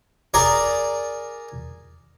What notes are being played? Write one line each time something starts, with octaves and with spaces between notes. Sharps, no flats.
G#4 A#4 D5